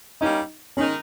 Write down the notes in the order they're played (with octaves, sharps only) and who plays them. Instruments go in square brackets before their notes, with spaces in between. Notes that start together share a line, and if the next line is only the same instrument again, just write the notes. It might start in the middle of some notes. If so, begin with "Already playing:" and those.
[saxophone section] G3 A#3 C#4 G4 [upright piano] D#4
[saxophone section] D#3 G#3 D#4 A#4 [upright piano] C#4